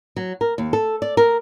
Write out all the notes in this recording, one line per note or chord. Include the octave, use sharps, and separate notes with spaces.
F#3
A#4
D#2
A4
D5
A#4